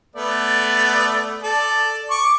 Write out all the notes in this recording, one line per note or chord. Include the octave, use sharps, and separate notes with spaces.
A3 B3 D5
A4 D5
C#6 D6